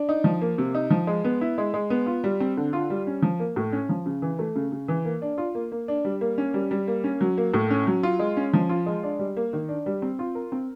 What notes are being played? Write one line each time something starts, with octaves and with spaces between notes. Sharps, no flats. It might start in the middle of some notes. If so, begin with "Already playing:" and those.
Already playing: D4
D#4
F3
A#3
C3
D#4
F3
G#3
B3
E4
G#3
G#3
B3
F4
G3
C4
D3
F4
G3
C#4
F3
A#3
A2
C#4
F3
C#3
E3
A3
C#3
C#3
E3
A#3
D4
F4
A#3
A#3
D4
G3
A#3
C#4
G3
G3
A#3
C#4
F#3
A#3
A2
C#4
F#3
F4
G#3
C#4
F3
F4
G#3
D4
G3
A#3
D#3
D4
G3
C4
F4
A#4
C4